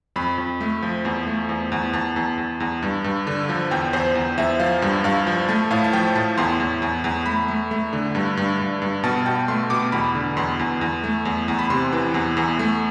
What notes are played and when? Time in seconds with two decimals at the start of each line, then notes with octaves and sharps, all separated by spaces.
0.16 F2 B5
0.38 F2
0.61 A3
0.82 F3
1.05 E2
1.27 A3
1.49 E2
1.72 E2
1.93 E2 A5
2.16 E2
2.38 E2
2.60 E2
2.82 G2
3.04 G2
3.27 D3
3.49 F3
3.71 E2 G5
3.93 E2 C5
4.15 E2
4.38 E2 E5
4.60 F3 F5
4.82 G2
5.04 G2 F5
5.27 F3
5.48 A3 A5
5.71 A2 F5
5.84 A5
5.93 F3 G5
6.15 A2 A5
6.38 E2 C6
6.60 E2
6.82 E2
7.04 E2
7.26 A3 B5
7.48 A3
7.71 A3
7.93 D3
8.15 G2
8.37 G2
8.59 G2
8.82 G2
9.04 B2 A5
9.26 B2 G5
9.48 A3 C6
9.70 B2 D6
9.92 E2 B5
10.15 D3
10.37 E2 C6
10.59 E2
10.81 E2
11.04 A3
11.25 E2
11.48 E2
11.59 B5
11.70 C3 C6
11.93 E3
12.14 E2
12.37 E2
12.59 A3